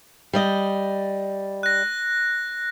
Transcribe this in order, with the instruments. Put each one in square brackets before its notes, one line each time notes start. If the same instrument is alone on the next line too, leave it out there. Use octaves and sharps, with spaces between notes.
[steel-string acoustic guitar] G3 D5 D#5
[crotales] F#6 A#6